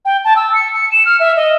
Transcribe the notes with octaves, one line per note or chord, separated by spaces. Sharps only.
G5
A5
E6
C#7
C#7
E7
F6
E5
D#5